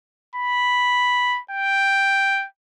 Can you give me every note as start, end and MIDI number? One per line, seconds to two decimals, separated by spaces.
0.36 1.40 83
1.51 2.46 79